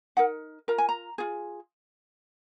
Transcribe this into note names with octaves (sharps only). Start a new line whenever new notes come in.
D#4 A#4 F#5
F4 A#4 A#5
G#5
A#5
F4 G#4